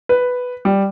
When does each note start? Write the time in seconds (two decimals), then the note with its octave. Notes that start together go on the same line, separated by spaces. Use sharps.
0.09 B4
0.65 G3